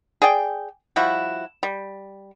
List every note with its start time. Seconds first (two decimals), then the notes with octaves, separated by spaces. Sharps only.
0.22 G#4 D5 G5
0.96 F3 G3 E4 F#4
1.63 G3